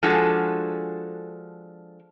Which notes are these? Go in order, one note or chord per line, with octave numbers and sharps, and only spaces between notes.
F3 G#3 D4 F#4 G#4 A4